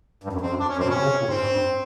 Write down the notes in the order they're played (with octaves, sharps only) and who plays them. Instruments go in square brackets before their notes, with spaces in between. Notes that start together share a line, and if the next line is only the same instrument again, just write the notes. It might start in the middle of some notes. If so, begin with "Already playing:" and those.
[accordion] G2
F#2
[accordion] F2 [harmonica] C4
[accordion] F#2
[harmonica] D4
C#4
[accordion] F#2 [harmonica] C4
[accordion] B2
[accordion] C3 [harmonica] C#4
[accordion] C#3
C3
A#2
G2
[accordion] G#2 [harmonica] C4
[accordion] G2
G2